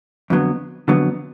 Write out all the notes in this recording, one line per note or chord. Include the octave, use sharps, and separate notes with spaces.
F2 D3 F#3 B3
F2 D3 F#3 B3